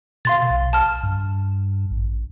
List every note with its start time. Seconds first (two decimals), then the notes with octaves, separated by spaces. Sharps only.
0.25 B2 F5 C6 A6
0.50 B1
0.73 A5 F6
1.03 G2
1.91 A1